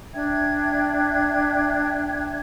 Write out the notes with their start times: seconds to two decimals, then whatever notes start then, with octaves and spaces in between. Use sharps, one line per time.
0.13 D4 E5 G5 G#6